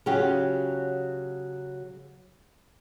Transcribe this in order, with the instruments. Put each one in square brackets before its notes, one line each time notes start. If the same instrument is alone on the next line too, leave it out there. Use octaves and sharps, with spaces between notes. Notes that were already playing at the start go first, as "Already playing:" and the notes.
[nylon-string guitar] C#3 F#3 F4 G4 G#4